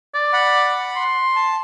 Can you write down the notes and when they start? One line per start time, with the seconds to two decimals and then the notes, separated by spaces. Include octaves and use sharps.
0.14 D5
0.33 F#5 B5
0.96 C6
1.36 A5